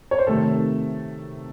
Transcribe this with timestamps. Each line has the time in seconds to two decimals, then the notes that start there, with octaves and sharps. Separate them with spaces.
0.11 C#5
0.19 C5
0.27 C3 D#3 A3 A4